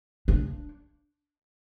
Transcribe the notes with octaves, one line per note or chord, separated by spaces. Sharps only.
D4